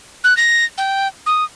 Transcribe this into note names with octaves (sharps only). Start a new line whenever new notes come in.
F#6
A#6
G5
D#6